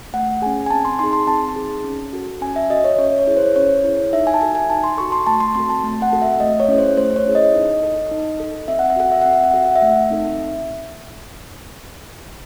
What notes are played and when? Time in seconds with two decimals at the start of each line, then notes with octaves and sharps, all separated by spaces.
0.14 A3 F#5
0.42 C#4 G#4 G#5
0.66 G#5
0.70 C4 A5
0.85 C6
0.99 D#4 G#4 C6
1.13 C6
1.27 C4 A5
1.56 D#4 G#4
1.84 C#4
2.13 F#4 A4
2.41 C#4 G#5
2.56 E5
2.70 F#4 A4 D#5
2.84 C#5
2.98 C#4 C#5
3.18 C#5
3.27 E4 G#4
3.37 C5
3.56 C#4 C#5
3.84 E4 G#4
4.13 D#4 E5
4.27 G#5
4.34 A5
4.41 F#4 A4 G#5
4.55 G#5
4.70 D#4 A5
4.84 C6
4.97 F#4 A4 C#6
5.12 C6
5.27 A3 A5
5.40 C6
5.55 C4 F#4 A4 C6
5.69 A5
5.83 A3
6.02 F#5
6.12 C4 F#4 A4
6.22 E5
6.40 A3 D#5
6.60 C#5
6.68 C#4 E4 G#4
6.78 C5
6.97 A3 C5
7.16 C#5
7.25 C#4 E4 G#4
7.35 D#5
7.54 D#4
7.83 A4
8.11 D#4
8.40 A4
8.68 C4 E5
8.79 F#5
8.90 E5
8.96 F#4 A4 F#5
9.12 E5
9.22 C4 F#5
9.33 E5
9.44 F#5
9.53 F#4 A4 E5
9.65 F#5
9.76 E5
9.82 A3
10.10 C4 D#4 A4